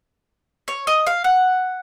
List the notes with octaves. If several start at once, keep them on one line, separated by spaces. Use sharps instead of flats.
C#5
D#5
F5
F#5